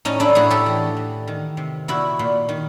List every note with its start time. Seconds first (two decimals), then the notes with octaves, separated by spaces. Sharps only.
0.05 A2 C#4 D#4
0.20 D4 E4
0.35 A2 F#4 G#4
0.50 G4 A4
0.66 E3
0.97 E3
1.27 D#3
1.57 C3
1.88 A#2 E4 F#4
2.19 A#2
2.49 D#3